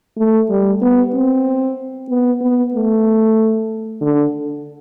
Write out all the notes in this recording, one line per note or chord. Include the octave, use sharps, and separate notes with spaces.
A3
G3
B3
C4
B3
B3
A3
D3